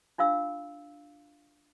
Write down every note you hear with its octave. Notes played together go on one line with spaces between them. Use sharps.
D4 F4 F5 E6